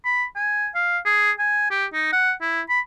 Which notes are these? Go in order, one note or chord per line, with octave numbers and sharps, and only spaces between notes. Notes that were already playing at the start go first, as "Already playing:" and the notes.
B5
G#5
F5
G#4
G#5
G4
D#4
F#5
E4
B5